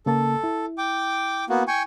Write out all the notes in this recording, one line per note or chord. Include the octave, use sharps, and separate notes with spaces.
C#3 A#3 A4 A5
E4
G5 D6
A#3 B3 F#4
G5 G#5 C#6